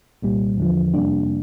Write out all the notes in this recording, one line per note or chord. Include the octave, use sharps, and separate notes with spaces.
C2 A#2 G3
E2 D3 F3
F2 C3 G3 A#3 D4